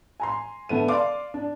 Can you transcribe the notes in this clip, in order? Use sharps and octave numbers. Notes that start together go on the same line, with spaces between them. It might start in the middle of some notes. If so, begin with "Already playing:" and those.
G#5 A#5 C6
D3 A3 B3 D#7
D5 F5 C6 D6
D4